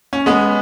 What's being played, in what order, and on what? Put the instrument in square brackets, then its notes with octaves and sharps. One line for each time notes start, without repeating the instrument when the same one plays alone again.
[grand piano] C#4
G#3 B3